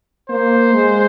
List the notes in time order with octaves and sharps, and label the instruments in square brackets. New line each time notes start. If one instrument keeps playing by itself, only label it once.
[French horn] A#3 [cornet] C5
[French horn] G#3